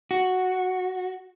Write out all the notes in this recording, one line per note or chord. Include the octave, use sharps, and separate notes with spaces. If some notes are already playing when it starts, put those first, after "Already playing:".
F#4